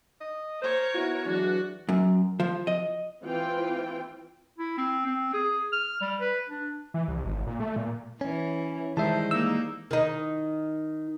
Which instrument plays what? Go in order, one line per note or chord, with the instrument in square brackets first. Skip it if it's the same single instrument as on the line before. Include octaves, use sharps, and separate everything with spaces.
[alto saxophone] D#5
[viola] A#4 C#5 [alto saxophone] C5
[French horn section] B3 E4 [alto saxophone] F#4
[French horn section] E3 F#3 G#3 [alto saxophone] D4 [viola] F#4
[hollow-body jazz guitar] F#2
F3
D#5
[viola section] E3 C4 F4 G5
[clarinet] E4
C4
C4
G#4
F6
G3
B4
D4
[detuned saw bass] E3
C2
G#1
A#2
A3
A#2
[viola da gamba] E3 [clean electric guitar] C#4
[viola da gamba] D#3 C5 [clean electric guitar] E3 G3 G#3 [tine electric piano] E5 A5
[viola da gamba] A#3 D#4 [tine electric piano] E6
[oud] D#3 D#4